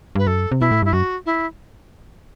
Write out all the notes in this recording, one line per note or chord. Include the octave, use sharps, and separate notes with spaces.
G2 B4
F#2 A4
C3
B2 E4
A2
G2 E4
F#2 F#4
E4